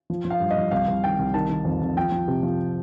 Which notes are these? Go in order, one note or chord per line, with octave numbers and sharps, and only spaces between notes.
F3
F3
F5
G2
D#5
F3
C2 F5
C2
D#3 G5
C2
D#3 A5
D#3
F2
F2
F3 G5
F3
C3
F3